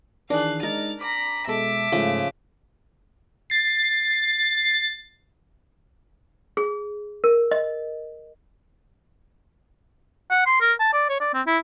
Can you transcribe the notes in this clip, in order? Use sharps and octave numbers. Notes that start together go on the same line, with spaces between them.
D#3 E3 D4 G#4 F5 F#6
G#3 D#4 A#4 A6 F7
A#5 B5 D6
B2 G#3 A4 E5 D6
G#2 C#3 F3 A3
A6 C7
G#4
A#4
D#5
F#5
C6
A#4
A5
D5
C#5
D5
C4
E4